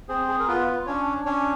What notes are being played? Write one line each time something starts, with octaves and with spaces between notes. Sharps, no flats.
C4 G#4 C5
G#4
A#4
B3 F4 B4
F4
C#4 D4 C#5
D4
C#4 D4 C#5